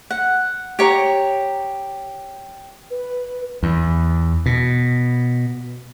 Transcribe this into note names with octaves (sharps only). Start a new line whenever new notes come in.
F#5
G4 C#5 A#5
B4
E2
B2